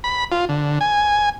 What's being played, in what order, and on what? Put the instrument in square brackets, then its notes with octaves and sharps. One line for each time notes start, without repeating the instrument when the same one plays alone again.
[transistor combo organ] B5
F4
D3
G#5